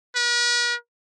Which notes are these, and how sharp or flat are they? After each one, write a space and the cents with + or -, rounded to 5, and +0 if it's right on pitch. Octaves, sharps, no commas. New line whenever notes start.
B4 -45